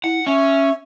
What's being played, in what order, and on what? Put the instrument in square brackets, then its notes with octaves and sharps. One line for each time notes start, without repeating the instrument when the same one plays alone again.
[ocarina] E4 [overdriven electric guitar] F#5
[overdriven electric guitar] C#4 [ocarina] E5